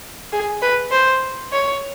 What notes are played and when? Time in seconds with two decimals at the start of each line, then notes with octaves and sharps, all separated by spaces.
0.32 G#4
0.62 B4
0.92 C5
1.53 C#5